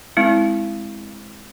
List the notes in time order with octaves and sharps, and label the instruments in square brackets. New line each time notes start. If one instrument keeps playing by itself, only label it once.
[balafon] G#3 C4 E4